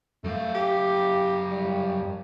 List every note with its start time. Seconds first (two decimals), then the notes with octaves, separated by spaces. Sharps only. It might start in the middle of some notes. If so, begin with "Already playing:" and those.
0.24 F#2 A3 F5
0.55 G4
1.51 G3